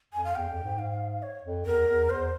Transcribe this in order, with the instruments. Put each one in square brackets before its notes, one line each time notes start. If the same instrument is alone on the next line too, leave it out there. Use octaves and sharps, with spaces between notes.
[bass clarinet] F2 [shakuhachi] G#5
[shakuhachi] F5
[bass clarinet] E2 [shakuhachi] G5
[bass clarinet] F2
G#2
[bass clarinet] G#2 [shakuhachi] F5
[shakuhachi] C#5
[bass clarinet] F2
[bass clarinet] E2 [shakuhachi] A#4
[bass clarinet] E2
[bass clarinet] E2 [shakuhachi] C5